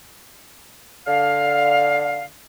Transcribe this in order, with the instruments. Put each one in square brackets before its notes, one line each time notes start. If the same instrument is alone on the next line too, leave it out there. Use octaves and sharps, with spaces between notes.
[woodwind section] D3 F5